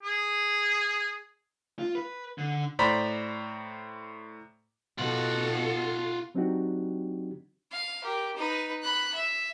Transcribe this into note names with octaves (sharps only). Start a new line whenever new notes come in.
G#4
F4
B4
D3
A2 C5 D5 A#5 B5 B6
B2 F4 A4 F#5
F#3 C4 D4 D#4 F#4 G4
F5
G4 A#4
D#4 B4
B5 F#6
E5